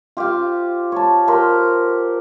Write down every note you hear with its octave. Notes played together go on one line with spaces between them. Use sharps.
F4 G4 C5 F5
C#5 A5
F4 G4 A#4 C5